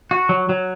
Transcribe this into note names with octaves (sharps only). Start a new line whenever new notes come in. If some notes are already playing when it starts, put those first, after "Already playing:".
F#4
F#3
F#3